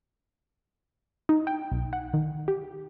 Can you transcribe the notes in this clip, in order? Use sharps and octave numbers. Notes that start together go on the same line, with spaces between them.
D#4
G5
B1
F#5
D#3
G4